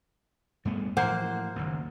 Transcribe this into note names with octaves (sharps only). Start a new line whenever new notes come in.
G2 A3 B3
A2 E3 F3 A#3 C5 F#5
F#1 D#2